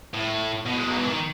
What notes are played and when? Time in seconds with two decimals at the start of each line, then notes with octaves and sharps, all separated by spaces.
0.14 A2
0.66 B2
0.77 G#3
0.88 F#3
0.97 E3
1.08 D#3